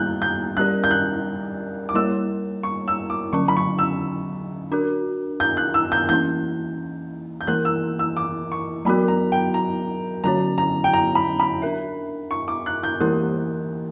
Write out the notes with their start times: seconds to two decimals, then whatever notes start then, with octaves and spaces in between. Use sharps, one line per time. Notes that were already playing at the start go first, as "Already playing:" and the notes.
Already playing: G3 A#3 F#6 G6
0.22 G6
0.57 G3 C#4 G4 A#4 D5 F#6
0.84 G6
0.91 F#6
1.89 D6
1.94 G3 A#3 E4 A#4 C#5 E6
2.63 C#6
2.88 E6
3.10 D6
3.33 D3 F#3 C#4 C#6
3.48 B5
3.57 C#6
3.79 E6
4.72 D4 F#4 A#4
5.40 G6
5.57 F#6
5.74 E6
5.92 G6
6.09 E3 A#3 C#4 E4 G6
7.41 G6
7.47 E3 A#3 E4 A#4 F#6
7.65 E6
7.99 E6
8.17 D6
8.52 C#6
8.85 F#3 B3 F#4 A#4 B5
9.08 A#5
9.32 G5
9.54 A#5
10.24 D3 F#3 C#4 F#4 C#5 A#5
10.58 A#5
10.84 G5
10.94 A#5
11.15 B5
11.40 B5
11.62 D4 A#4 E5
12.31 C#6
12.48 D6
12.66 F#6
12.83 G6
13.00 E3 A#3 E4 G4 A#4